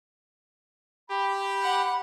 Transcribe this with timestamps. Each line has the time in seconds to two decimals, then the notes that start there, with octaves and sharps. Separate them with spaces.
1.09 G4 B5
1.62 F#5